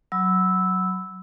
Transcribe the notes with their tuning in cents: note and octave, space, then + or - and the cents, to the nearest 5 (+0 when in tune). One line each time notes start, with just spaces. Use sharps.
F#3 +0 B5 +20 E6 -10